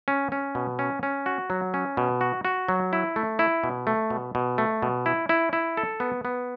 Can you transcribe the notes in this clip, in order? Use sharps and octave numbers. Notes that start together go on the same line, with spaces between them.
C#4
C#4
B2
C#4
C#4
F#4
F#3
C#4
B2
F#4
F#4
F#3
E4
A3
E4
B2
A3
B2
B2
A3
B2
E4
E4
E4
A4
B3
B3